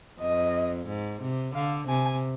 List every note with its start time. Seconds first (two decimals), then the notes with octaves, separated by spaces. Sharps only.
0.21 F2 D#5
0.87 G#2
1.22 C3
1.55 D3 F5
1.88 C3 G#5